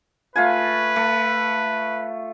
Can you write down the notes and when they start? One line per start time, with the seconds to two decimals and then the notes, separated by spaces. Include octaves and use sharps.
0.36 A3 F4 B4 G#5
0.96 A3